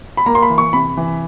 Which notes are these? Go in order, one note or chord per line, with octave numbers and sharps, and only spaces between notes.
B5
A#3 A#5
C6
B5
E3
C#6
C3 B5
E3